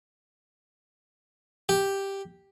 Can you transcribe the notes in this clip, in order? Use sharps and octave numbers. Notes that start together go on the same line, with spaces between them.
G4